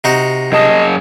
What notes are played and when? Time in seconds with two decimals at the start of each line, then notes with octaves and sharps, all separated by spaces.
0.04 C3 D#4 F#4
0.52 F#2 G#4 D#5 A5